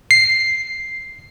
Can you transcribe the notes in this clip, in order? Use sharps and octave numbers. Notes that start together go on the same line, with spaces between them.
C7